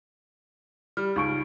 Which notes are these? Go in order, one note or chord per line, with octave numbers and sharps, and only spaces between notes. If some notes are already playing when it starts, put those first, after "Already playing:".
G3 F6
C#2 D#4 C#6 D7